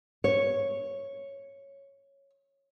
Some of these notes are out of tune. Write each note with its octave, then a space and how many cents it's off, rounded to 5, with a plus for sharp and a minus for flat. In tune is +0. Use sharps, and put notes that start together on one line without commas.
C#5 -5